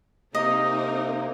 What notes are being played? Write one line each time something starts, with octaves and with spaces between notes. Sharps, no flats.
C3 A#3 C4 D#4 A#4 D#5